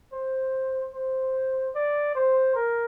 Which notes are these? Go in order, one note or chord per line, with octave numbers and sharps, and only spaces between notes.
C5
C5
D5
C5
A#4